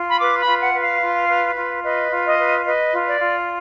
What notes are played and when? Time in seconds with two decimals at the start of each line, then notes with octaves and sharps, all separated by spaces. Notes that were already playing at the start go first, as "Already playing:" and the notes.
Already playing: F4
0.09 B5
0.19 B4 D6
0.40 B5
0.46 F4
0.60 F#5
0.73 B4
0.81 F5
1.01 F4
1.28 B4
1.56 F4
1.84 B4 D#5
2.12 F4
2.25 D#5
2.39 B4
2.66 B4 D#5
2.93 F4
3.07 D5
3.21 F4